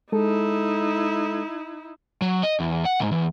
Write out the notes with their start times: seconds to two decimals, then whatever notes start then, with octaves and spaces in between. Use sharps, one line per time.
0.12 G#3 D#4 E4 A4
2.22 F#3
2.43 D#5
2.60 E2
2.85 F#5
3.00 C#2 G#2
3.12 E2